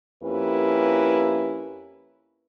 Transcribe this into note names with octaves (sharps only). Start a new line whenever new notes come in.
F2 A#3 C#4 E4 G4 B4